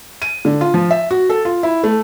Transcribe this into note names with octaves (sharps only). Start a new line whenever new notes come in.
D#7
D3
F4
F3
E5
F#4
A4
F4
E4
A3